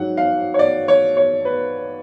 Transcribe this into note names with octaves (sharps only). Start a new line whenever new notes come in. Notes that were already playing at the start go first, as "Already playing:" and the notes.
Already playing: G#2 F#3 F#5
F5
C#5
D5
C#5
C#5
B4